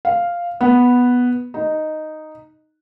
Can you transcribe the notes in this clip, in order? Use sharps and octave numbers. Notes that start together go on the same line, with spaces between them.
F5
B3
D#4